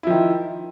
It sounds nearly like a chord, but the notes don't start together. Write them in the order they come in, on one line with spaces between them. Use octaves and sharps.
E4 F3 D#3